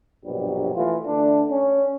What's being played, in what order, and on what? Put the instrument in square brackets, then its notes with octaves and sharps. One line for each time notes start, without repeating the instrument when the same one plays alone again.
[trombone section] A#1 G2 B2 F#3 G3
E3 A3 F4
D3 A3 D4
C#4